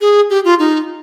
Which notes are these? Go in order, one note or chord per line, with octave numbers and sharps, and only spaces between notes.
G#4
G4
F4
D#4